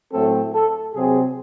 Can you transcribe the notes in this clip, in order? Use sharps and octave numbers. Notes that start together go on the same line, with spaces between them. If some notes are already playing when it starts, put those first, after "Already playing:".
A2 F#3 A3 C4 A4
A4
C3 F#3 C4 G#4